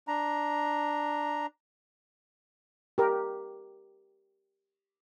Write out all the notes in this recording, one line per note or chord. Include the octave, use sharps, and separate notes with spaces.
D4 A#5
G4 A#4